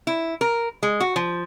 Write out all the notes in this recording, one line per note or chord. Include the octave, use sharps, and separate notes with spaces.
E4
A#4
G#3
F#4
F3